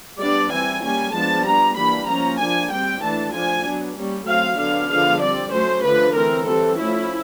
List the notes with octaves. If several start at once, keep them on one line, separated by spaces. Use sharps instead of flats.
G3 B3 D4 D5
E3 G3 C4 G#5
G3 A#3 C#4 G#5
F3 G#3 B3 D4 A5
G3 B3 D4 A#5
E3 G3 A#3 D4 B5
F3 A#3 C#4 A#5
F3 A#3 D4 G#5
G3 C4 G5
E3 A3 D4 A5
F3 A3 D4 G#5
F#3 B3 D4
G3 A#3 C#4
F#3 A3 C4 F5
D3 F#3 B3 D4 F5
D3 F3 G#3 B3 D4 F5
G3 C4 D5
F#3 A3 C#4 C5
D3 F3 A3 B4
E3 A3 C4 A#4
E3 G3 C4 A4
F3 A3 C#4 E4